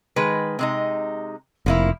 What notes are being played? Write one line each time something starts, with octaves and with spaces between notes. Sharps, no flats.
D#3 G#3 B4
C3 G#3 D#4
F1 F3 A#3 E4